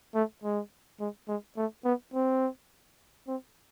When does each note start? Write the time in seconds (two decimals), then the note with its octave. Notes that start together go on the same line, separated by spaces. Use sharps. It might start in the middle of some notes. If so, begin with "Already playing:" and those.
0.15 A3
0.44 G#3
1.00 G#3
1.28 G#3
1.57 A3
1.85 B3
2.14 C4
3.28 C4